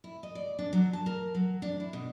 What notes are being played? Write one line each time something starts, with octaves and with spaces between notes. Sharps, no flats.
E4
D#5
D5
D4
F#3
A5
A#4
F#3
D4
E4
B2